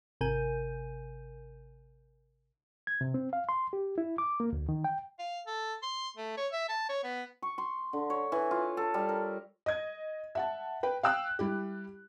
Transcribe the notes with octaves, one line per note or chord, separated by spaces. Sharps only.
G#1 C3 A#4 G#5 G6 D#7
G#6
C3
C4
F5
C6
G4
E4
D6
A#3
D2
D#3
G5
F5
A4
C6
A3
C#5
E5
A5
C#5
B3
C#6
C6
D3
C#5
E3
F4
A4
G3
A#4
D#5 G#6
E5 F#5 A5
B4 G5
F5 G5 E6 F#6
G3 E4 G4